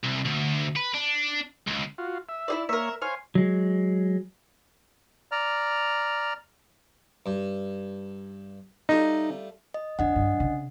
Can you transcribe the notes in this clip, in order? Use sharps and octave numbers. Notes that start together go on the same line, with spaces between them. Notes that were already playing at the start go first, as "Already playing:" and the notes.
C2
D2
B4
D4
C#2
F4 F#4
E5
E4 G#4 D5
A#3 A#4 C#5 E5
C5 C#5 F5 G#5
F#3 G#3
D5 A#5 F6
G2
G3 A3 D#4 F4
D#5
F2 D4 D#5 F#5
G2
C#3